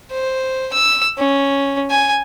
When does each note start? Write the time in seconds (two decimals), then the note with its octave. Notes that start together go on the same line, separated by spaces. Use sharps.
0.12 C5
0.73 E6
1.18 C#4
1.90 G#5